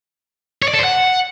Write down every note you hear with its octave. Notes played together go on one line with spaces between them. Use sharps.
C#5
D5
A4
C5
F#5